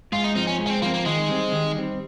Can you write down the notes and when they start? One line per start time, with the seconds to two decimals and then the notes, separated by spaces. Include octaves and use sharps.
0.12 G#2 F4
0.24 D#4
0.35 F3 C4 D#4
0.47 C#4
0.59 G#2
0.67 C#4
0.70 C4
0.82 F3 A#3
0.86 C4
0.94 A#3
1.05 D#3 G#3
1.29 G3 C4
1.52 D#3
1.75 G3 C4